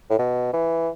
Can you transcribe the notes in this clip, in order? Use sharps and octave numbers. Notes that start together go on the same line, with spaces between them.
A2
B2
E3